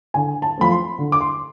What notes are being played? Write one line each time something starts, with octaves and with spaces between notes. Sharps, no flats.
D3 G#5
A5
F3 A3 C4 B5
C6
D3
D6
C6